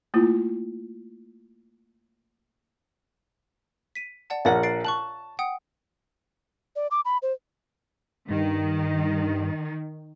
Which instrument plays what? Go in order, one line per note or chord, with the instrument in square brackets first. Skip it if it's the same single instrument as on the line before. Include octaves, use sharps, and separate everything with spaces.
[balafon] A3 A#3 E4 F4
[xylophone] B6 D#7
D5 F#5 A5
[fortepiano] A#1 A#4 F#5 [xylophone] C#5 A6
[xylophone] A6 C7 D7
[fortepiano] A5 [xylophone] C#6 F#6 F#7
[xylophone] F#5 G5 D#6
[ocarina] D5
D6
B5
C5
[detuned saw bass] G2 [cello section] D#3